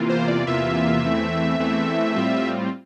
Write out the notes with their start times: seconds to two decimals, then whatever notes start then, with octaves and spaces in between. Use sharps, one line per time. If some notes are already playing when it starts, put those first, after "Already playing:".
Already playing: E2 C3 E3 A#3 F4
0.10 C5
0.28 D5
0.47 E2 C3 E3 A#3 F4 E5
1.03 E2 E3 A3 C4
1.59 E2 E3 A3 C4
2.16 A2 G3 C4 F4